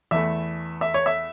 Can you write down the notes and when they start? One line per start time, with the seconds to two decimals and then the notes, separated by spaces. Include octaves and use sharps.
0.11 E2 E3 A3 E5
0.81 E5
0.94 C#5
1.06 E5